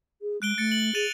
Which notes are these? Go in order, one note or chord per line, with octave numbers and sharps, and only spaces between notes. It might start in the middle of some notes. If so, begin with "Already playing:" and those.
G#4
G#3 F#6 D7 G7
A3 A6 C#7
F#7
G#4 A6 D#7 F7